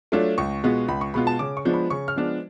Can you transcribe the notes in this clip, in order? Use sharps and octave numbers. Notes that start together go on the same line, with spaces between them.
F#3 A3 D4 F4
C#2 C#6
B2 G#3 B3 F4
C#2 B5
C#6
B2 G#3 B3 F4 B5
A5
C#3 D6
C#6
F3 G#3 B3 D4
B5
C#3 C#6
F6
F3 G#3 B3 D4